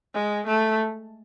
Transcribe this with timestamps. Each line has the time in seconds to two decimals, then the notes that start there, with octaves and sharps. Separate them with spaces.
0.14 G#3
0.46 A3